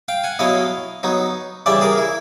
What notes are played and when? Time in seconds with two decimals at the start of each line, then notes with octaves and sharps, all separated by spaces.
0.08 F5 G5
0.24 F#5 G#5
0.39 B2 F#3 B3 E4 D#5 F5
1.03 F#3 B3 D#4
1.66 C#3 E3 G3 D5 E5
1.81 G#4 A#4
1.97 E4